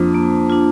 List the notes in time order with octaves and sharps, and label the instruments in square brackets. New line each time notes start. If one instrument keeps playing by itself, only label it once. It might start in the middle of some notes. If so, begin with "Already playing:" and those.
Already playing: [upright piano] F2 [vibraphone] A#3 D4 F4
[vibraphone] A#3
D4 F4